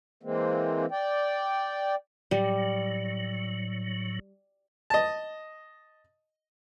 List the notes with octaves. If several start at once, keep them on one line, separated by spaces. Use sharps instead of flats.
E3 G#3 A#3 C4
D5 G5
A2 F#3 G3
D#5 A5